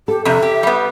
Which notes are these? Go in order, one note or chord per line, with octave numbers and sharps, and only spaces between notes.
G4 A4
F2 C3 E5
G4
G3 B3